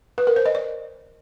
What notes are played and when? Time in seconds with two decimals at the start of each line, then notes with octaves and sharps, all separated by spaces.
0.18 B4
0.27 A#4
0.36 C5
0.46 D#5
0.55 D5